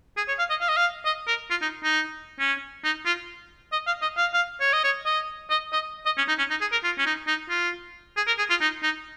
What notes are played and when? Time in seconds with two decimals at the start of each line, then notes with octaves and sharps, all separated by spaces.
0.17 G#4
0.28 C#5
0.39 F5
0.50 D#5
0.61 F5
0.69 D#5
0.77 F5
1.05 D#5
1.27 A#4
1.50 F4
1.62 D#4
1.83 D#4
2.39 C#4
2.84 D#4
3.06 F4
3.72 D#5
3.87 F5
4.02 D#5
4.17 F5
4.33 F5
4.61 C#5
4.73 D#5
4.84 C#5
5.06 D#5
5.50 D#5
5.73 D#5
6.06 D#5
6.17 C#4
6.28 D#4
6.39 C#4
6.50 D#4
6.61 G#4
6.72 A#4
6.84 F4
6.98 C#4
7.06 D#4
7.27 D#4
7.49 F4
8.17 G#4
8.27 A#4
8.38 G#4
8.50 F4
8.61 D#4
8.83 D#4